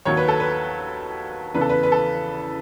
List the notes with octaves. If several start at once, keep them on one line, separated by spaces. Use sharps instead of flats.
D#2 D#3 F#3 C#5
B4
A4
B4
E2 C#3 E3 B4
A4
B4
B4
A4